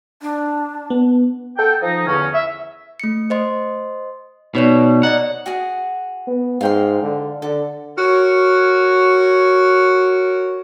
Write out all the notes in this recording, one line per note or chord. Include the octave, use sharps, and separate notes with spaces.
D4
B3
A4 F#5 G5
F3 D#4
E2 D3 C#4
E5
A3 C#7
C5 D#5 C6
B2 D#4 C#5 D5
D5 D#5 F#5 A#5
F#4 G#4 F#5
B3
G#2 F5 G5 C6
D3
D3 A4
F#4 A#4 C#5